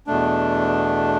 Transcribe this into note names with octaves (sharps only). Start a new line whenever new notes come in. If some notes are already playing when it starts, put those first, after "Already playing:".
E2 B2 A3 D4